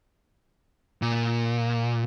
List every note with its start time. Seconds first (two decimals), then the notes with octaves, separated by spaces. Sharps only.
1.02 A#2